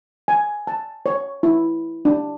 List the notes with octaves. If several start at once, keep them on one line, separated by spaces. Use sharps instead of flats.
G#5
A5
C#5
E4
D4